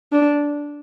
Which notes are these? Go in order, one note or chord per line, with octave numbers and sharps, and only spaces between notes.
D4